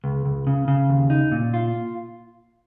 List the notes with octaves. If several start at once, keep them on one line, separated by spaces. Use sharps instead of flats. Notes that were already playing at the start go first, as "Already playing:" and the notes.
C#2
C#2
C#3
C#3
D#2
D#4
A#2
F4